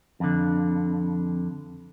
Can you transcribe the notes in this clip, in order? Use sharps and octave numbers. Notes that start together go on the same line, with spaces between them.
F2 D3